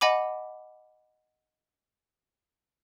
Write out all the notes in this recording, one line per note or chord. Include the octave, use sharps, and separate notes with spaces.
D#5 F#5 G#5 B5 D6